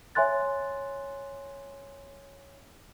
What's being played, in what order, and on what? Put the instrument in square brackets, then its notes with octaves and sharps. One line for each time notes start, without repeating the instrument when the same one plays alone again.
[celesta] C#5 E5 G#5 C6 F#6 A6